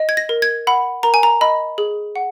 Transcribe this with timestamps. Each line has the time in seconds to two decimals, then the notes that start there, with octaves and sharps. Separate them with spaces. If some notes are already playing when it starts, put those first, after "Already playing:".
Already playing: D#5
0.09 G#6
0.17 A#6
0.29 A#4
0.42 G#6
0.67 F#5 B5
1.03 A#4 A#5
1.14 G#5
1.23 A#5
1.41 D#5 B5
1.78 G#4
2.16 F#5